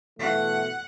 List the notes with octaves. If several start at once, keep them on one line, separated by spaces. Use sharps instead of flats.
B2 E3 A3 F#5